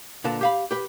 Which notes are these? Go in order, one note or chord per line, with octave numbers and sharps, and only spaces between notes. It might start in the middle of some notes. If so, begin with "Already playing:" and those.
A#2 D3 B4 A5
G4 F5 B5
G4 B4